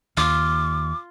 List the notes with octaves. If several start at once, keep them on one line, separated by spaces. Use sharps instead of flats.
D#2 F4 D6